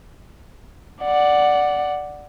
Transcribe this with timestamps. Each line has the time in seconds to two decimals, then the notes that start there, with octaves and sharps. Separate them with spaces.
1.04 D5 F#5